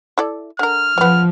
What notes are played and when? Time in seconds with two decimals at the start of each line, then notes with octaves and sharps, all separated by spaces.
0.18 E4 A4 D5
0.59 D3 A#4 F6
0.98 C#3 F3 B3